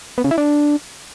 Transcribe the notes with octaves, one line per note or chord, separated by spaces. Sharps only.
B3
C#3
E4
D4